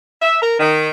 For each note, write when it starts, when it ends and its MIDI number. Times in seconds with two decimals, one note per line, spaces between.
0.21 0.38 76
0.41 0.56 70
0.59 0.90 51